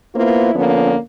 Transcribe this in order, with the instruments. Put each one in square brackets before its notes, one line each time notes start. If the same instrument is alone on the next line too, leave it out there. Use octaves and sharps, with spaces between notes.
[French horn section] A#3 B3 E4 F4 C5
D3 F3 A#3 B3 C#4